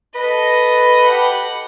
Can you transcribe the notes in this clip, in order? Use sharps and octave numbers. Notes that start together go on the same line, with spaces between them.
A4 B4 D#5
G4 F#5